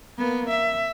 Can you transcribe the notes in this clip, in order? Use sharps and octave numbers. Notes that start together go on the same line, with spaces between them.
A#3 B3
E5